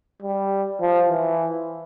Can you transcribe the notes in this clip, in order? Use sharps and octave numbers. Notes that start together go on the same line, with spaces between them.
G3
F3
E3